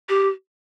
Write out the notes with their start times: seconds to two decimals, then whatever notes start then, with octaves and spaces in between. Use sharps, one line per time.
0.09 G4